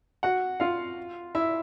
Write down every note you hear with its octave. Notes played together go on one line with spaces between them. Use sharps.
F#4 F#5
F4 F5
E4 E5